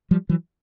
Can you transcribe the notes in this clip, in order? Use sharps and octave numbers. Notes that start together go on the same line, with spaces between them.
F3 G3
E3 F#3